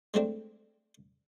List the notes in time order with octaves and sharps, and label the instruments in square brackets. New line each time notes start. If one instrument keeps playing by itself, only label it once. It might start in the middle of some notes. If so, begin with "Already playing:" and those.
[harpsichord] G#3 A3 C4 D4